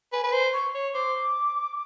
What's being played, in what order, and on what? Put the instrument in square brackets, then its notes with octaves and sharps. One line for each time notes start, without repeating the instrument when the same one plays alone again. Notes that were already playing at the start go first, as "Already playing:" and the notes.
[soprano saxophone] B4 [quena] G#5
[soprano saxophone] B4
C5
[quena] C#6
[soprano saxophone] C#5
[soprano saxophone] C5 [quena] D6